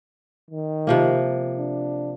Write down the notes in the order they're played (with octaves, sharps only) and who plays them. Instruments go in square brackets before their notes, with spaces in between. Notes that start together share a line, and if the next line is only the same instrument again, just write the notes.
[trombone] D#3
[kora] C3 F3 A#3
[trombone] D4